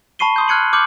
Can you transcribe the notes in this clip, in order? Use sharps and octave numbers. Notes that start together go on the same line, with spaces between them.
A5 B5 C#6 C7 D#7 G7
C6 D#6 G6
F6 F#6 G#6 C#7 D#7 F#7
D6 F6 G6 C#7 F#7